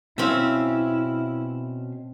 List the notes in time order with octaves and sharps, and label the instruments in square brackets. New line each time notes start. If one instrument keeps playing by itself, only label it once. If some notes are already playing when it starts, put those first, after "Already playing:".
[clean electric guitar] B2 C#4 F5 [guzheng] C4 E5 [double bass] E4